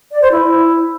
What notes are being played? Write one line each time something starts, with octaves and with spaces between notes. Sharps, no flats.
D5
C5
E4